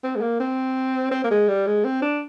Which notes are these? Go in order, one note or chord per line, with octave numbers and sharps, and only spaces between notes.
C4
G#3
A#3
C4
C4
A#3
G#3
G3
G#3
C4
D4